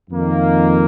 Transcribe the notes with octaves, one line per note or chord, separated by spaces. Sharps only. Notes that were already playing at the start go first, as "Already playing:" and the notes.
F2 D#3 A#3